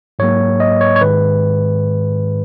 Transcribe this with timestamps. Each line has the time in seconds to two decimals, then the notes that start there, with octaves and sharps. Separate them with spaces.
0.19 G#2 F#3 A#3 C#5
0.60 D#5
0.81 C#5
0.96 C#5
1.01 G#2 D#3 G#3 B4